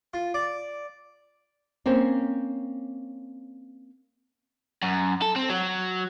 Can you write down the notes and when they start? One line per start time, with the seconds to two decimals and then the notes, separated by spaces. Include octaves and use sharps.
0.14 F4
0.34 D5
1.86 A#3 C4 C#4
4.83 F#2
5.22 A4
5.36 C4
5.50 F#3